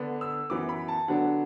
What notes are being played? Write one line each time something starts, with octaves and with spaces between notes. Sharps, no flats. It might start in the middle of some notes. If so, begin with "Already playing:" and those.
Already playing: D3 B3 D4
E6
F#2 E3 B3 D6
B5
A5
D3 F#3 B3 D4 F#5